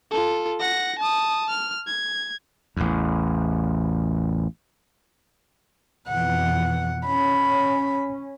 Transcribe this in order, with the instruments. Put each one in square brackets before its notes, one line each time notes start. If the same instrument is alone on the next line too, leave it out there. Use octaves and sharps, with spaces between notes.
[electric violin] F4 A4
F#5 A#6
A5 D#6
F6
G#6
[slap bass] A1 E2
[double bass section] F2 B2 E3 [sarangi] F#5
[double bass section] C#4 [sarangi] B5